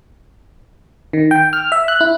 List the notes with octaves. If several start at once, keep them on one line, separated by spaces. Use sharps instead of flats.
D#3
G5
F6
E5
F#6
E4